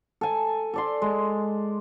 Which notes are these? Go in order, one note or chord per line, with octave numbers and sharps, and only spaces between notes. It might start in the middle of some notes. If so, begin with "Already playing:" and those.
A4 G#5
A4 D5 C6
G#3